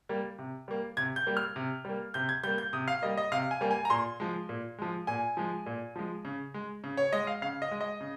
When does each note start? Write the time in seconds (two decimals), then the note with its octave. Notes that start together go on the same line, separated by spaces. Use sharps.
0.09 G3 A#3
0.39 C3
0.68 G3 A#3
0.97 C3 G#6
1.16 G6
1.27 G3 A#3
1.37 F6
1.56 C3
1.85 G3 A#3
2.14 C3 G6
2.29 G#6
2.43 G3 A#3 G6
2.58 G6
2.73 C3 D#6
2.88 F5
3.02 G3 A#3 D#5
3.17 D#5
3.32 C3 F5
3.51 G#5
3.61 G3 A#3
3.71 G#5
3.85 A#5
3.90 A#2 C6
4.20 F3 G#3
4.49 A#2
4.78 F3 G#3
5.07 A#2 G#5
5.37 F3 G#3
5.66 A#2
5.96 F3 G#3
6.25 C#3
6.54 G#3
6.84 C#3
6.97 C#5
7.13 G#3 D#5
7.27 F5
7.42 C#3 F5
7.62 D#5
7.71 G#3
7.81 D#5
8.01 C#3